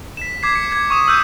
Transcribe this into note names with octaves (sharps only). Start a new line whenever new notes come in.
B6 E7
D6 G#6 B6 C7
C#7
G#6
C#6 D#6 E7
E6 F#6 G6 D#7